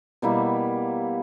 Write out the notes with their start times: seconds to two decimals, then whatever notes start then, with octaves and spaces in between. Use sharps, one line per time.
0.22 B2 G3 A#3 E4